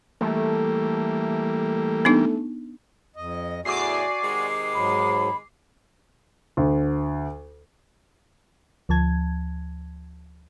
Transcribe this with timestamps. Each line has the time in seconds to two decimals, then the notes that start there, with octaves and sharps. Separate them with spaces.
0.21 E3 G3 A3 A#3
2.05 B3 D4 D#4
3.16 F2 D#5
3.65 E2 A2 F#4 D5 G#5 D6 C7
4.23 C3 D#3 G#3
4.74 G#2 F#3 B5
6.57 D2
8.89 D2 F3 A5 G#6